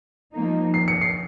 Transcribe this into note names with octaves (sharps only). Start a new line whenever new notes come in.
F3 A#3 D#4
C7
C#7
C7